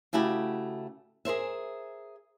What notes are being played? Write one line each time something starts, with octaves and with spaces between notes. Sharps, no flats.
C#3 A3 E4 F#4 G4
G#4 A#4 C5 E5